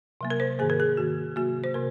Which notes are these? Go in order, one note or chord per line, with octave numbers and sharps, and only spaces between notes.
C3 F#3 A#3
A#4
C5
G#2 D#3 A#3 G#4
A#4
G#4
G#2 D#3 A#3 F#4
C3 F#3 A#3 F#4
C5
C3 A#3 A#4